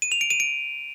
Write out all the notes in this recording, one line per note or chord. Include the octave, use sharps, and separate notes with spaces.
D#7
F7
D7
D#7
D7